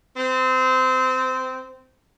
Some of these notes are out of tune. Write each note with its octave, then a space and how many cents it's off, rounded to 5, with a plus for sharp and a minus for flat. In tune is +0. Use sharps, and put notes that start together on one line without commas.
C4 -20